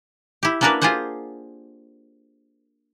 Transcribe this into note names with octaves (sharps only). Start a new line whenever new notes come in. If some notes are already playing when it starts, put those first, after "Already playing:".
E4 G4
A#3 C#4 D4 F#4 A#4 B4
F4 G4 G#4 C5 F#5